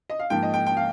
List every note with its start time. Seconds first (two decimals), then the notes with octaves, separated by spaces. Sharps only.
0.10 D#5
0.19 F5
0.30 G#2 F3 A#3 G5
0.43 D#5
0.54 G5
0.66 G5
0.77 F5